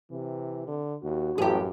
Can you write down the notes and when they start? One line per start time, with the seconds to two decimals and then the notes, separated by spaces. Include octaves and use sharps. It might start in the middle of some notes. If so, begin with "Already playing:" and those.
0.11 C3 E3
0.67 D3
1.02 D#2 F#4
1.38 A1 F#2 G4 G#4